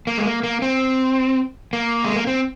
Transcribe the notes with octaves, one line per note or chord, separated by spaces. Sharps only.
A#3
G#3
A#3
A#3
C4
A#3
G#3
A#3
C4